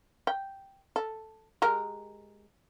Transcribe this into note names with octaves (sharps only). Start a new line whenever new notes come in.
G5
A4
G#3 G4 A#4